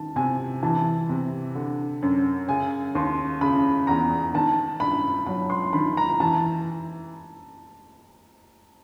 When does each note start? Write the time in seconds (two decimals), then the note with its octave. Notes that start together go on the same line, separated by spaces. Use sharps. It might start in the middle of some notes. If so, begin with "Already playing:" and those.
Already playing: D#3 A5
0.16 C3 G#5
0.63 E3 A5
1.09 C3
1.55 D3
2.02 F#2
2.48 C#3 G#5
2.95 D#2 C6
3.41 C#3 B5
3.87 E2 A#5
4.34 D#3 A5
4.80 G2 B5
5.27 F#3 B5
5.50 C6
5.73 D#3 B5
5.97 A#5
6.20 E3 A5